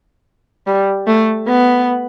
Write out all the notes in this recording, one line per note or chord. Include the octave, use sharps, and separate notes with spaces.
G3
A3
B3